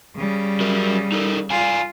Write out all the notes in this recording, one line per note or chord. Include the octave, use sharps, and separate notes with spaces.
C#3 G3
F#3 A#4
D#4 A4 A#4
F4 D5 F5 G#5